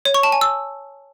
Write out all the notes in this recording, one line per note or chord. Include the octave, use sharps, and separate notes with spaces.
C#5
C#6
A5
G#5
E6